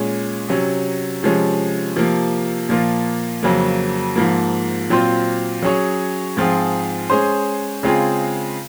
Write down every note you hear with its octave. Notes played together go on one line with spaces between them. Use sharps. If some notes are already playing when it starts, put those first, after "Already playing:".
Already playing: A#2 G#3 C#4
C3 F#3 C#4
C3 F3 G#3 C#4
C3 F3 A#3
A#2 F3 A#3 F4
F2 C#3 F#3 A#3
G#2 F3 A#3
A#2 F#3 C4 F4 C5
F#3 C#4 G#4 C#5
G#2 F3 C4 F4 G#4
G#3 C#4 G#4 C5
C#3 G#3 C4 F4 G#4